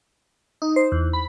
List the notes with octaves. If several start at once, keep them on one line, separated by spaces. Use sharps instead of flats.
D#4
C5
E2
B5